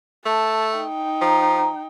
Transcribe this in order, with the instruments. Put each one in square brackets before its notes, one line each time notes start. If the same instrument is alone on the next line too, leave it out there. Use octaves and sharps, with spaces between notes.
[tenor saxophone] A3 [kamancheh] A5
[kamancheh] D#4 G5
[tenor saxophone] F3 [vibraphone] A#5